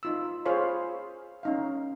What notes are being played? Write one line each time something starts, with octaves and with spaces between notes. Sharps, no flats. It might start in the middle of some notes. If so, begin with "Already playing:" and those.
D#4 F4 E6
F4 G#4 C5 C#5 F5 B5
C#4 D#4 F5